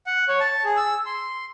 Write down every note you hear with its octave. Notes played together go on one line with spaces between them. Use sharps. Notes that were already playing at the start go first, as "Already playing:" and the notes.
F#5
C#5
A5
G#4
E6
C6